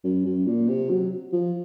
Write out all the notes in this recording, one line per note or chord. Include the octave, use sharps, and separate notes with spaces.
F#2
F#2
A#2
C3
F#3
F3